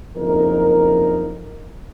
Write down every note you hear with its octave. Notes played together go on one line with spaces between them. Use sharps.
F#1 F2 D#4 A#4